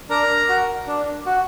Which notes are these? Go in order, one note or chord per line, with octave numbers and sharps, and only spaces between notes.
D4 A#4 A#5
F#4
D4
F#4